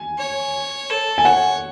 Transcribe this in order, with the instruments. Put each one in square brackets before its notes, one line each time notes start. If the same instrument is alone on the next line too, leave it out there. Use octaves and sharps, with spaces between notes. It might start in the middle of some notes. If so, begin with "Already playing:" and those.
Already playing: [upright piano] G#5
[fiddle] C#5
A4
[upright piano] G#5
[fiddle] C#5 [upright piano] F#5